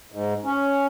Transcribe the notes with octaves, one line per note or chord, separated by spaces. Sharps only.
G#2
C#4